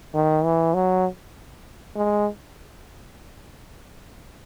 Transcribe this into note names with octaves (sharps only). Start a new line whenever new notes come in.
D#3
E3
F#3
G#3